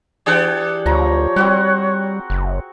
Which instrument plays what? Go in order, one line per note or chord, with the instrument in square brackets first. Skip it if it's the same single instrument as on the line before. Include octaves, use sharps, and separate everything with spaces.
[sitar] E3 D4 G4 [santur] G#4 F#5 G5
[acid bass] D2 [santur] F3 A#5 [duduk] C#5
[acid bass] G3 [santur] C4 F#4 F#5
[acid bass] F#1